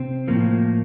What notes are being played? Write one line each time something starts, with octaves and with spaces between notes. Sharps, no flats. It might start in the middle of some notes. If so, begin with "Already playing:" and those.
Already playing: C3 C4
A2 F3 A#3